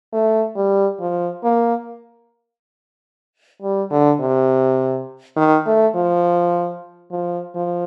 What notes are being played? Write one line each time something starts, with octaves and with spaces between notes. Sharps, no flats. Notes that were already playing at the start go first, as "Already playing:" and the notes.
A3
G3
F3
A#3
G3
D3
C3
D#3
A3
F3
F3
F3